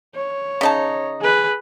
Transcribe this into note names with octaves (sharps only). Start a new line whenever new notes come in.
C#5
C#3 D#4 A5
G#4 B4